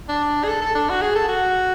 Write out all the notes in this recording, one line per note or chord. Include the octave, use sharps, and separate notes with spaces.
D4
G#4
A4
A4
D4
F#4
G#4
A4
F#4